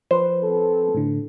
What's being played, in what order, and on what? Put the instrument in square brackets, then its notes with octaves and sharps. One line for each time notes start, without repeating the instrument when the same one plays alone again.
[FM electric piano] F3 B4 [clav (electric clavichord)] C5
[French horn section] C4 A4
[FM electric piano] A2 D3